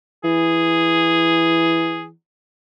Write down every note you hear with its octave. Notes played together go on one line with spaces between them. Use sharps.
E3 G#4